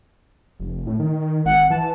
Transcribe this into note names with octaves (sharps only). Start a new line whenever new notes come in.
F1
A2
D#3
G#1 F#5
E3 A5